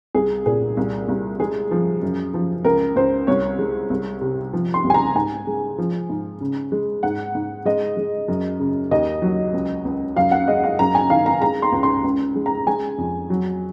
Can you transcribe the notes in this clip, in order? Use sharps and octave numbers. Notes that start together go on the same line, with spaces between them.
C2 G#4
A#2 G#4
C2
C2
G#3 G#4
F3
F#2
F3
C#2 A#4
C#2 C5
C2 C#5
G#3
C2
C3
F3
C6
C2
G#5
A#5
G#2 G#5
G#3
F3
G#2
C#3
G#3
G#2 F#5
G#2
G#3 D#5
G#3
F#2
C#3
D#2 D#5
F#3
C#2
C#2
F#2 F5
F#5
G#3 D#5
F5
F#2 A#5
G#5
D#3 F5
A#5
G#3 A#5
C6
C#2
C6
C#2
G#3
A#5
G#3 G#5
F2
F#3